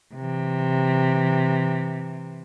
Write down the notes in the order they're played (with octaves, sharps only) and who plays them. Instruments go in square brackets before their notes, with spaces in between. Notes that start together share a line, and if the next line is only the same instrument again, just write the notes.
[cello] C3 E3